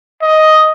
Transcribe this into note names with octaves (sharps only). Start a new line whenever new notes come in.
D#5